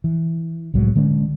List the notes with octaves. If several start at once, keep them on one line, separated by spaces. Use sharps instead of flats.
E3
C2 A2 F#3 G#3
D3 G#3 C#4